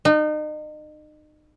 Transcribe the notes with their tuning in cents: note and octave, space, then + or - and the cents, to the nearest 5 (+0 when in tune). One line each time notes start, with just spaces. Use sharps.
D#4 -35